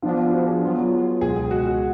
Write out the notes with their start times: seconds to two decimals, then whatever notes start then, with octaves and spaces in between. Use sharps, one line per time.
0.02 F3 B3 D4 F4
0.17 F4
0.32 F3 B3 D4 F#4
0.47 G#4
0.62 F#3 B3 F4
0.92 F#3 B3 F4
1.21 C#2 B2 G#3 G#4
1.36 G#4
1.51 C#2 B2 G#3 F#4
1.66 F#4